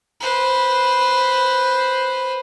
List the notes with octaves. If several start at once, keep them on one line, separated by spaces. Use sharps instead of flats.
B4 C5